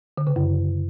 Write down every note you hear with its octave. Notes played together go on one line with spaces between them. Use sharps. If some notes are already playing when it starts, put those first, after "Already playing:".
D3
C#3
F#2